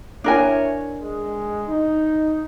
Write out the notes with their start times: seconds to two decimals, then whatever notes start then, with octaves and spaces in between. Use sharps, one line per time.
0.24 D4 E4 A#4 C#5 G#5
0.99 G#3
1.67 D#4